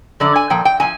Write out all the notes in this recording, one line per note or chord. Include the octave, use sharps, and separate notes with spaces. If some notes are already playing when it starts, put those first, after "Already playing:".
F#2 D3 F3 D5
G#5
A#2 F3 G5
G5
A#2 F3 G#5